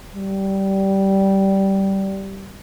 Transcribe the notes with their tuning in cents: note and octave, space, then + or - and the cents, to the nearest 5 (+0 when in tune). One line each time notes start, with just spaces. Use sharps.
G3 -15